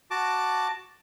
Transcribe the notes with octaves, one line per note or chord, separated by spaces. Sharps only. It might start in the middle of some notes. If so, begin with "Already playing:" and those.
F#4 A5 D6